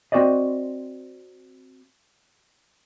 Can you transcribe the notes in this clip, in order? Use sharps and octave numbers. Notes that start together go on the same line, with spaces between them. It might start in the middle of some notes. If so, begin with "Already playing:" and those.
C4 C#4 F#4 C5 D5 D#5